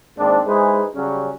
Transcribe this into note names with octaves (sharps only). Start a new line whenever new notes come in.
G#2 D#3 A#3 C4 D4
G#3 D#4 E4 G#4 B4 C5
C#3 F#3 G3 C#4